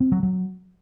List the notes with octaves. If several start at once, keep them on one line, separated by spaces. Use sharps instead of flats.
C4
F#3
F#3